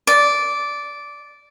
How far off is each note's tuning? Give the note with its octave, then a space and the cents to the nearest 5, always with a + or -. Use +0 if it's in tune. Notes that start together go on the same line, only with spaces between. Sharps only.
D5 -10